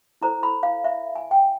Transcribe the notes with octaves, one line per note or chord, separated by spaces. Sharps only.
E4 A4 C5 A#5
B5
F5
E5
G#5
G5